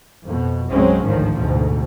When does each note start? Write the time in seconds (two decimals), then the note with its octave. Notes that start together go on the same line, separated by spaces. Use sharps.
0.24 F2 B2
0.71 F#1 B1 F#3 G#3 C4 C#4
1.06 A1 D2 G#2 D#3 F3
1.37 D2 G#2 B2